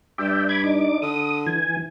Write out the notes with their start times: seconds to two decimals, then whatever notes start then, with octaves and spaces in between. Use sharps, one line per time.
0.18 G2 D5 E5 G5
0.49 B5 D6 G#6
0.64 D4 D#4 D6
1.02 D3 D#6
1.47 E3 G#5